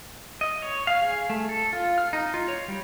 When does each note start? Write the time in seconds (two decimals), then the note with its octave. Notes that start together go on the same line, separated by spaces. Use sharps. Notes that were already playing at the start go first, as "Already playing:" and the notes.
0.41 D#5
0.62 C#5
0.87 F5
1.02 G#4
1.30 A3
1.49 A4
1.73 F4
1.98 F6
2.13 D#4
2.34 F4
2.48 C#5
2.68 G3